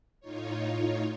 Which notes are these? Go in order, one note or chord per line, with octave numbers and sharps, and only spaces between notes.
A2 D#4 F4 C#5